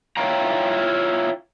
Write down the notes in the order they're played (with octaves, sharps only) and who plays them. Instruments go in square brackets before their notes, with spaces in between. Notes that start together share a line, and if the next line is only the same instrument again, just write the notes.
[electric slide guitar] E4 F4 C#5 F5 G5 A#5